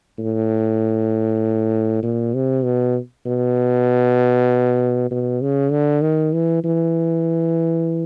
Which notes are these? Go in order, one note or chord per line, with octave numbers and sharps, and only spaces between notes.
A2
A#2
C3
B2
B2
B2
C#3
D3
D#3
E3
E3